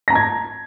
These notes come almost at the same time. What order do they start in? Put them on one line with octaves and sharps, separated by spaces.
A#6 A#5 A5 G#6